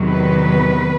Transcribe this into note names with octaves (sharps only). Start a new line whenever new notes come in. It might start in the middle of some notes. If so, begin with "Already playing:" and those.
Already playing: E2 C3 D#3 F#3
B4